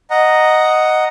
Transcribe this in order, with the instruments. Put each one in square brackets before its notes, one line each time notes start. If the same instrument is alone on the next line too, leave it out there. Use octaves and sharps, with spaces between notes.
[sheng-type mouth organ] D#5 F#5 A#5